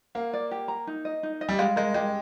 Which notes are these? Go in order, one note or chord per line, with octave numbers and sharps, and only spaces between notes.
A#3 F5
D5
G4
A#5
D#4
D#5
D#4
D#5
G3
G#3 F5
G#3 A#4
G#3 G4